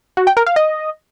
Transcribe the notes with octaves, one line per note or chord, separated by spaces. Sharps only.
F#4
G5
A#4
F5
D#5